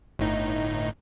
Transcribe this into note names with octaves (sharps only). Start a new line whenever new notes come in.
G1 A2 D#4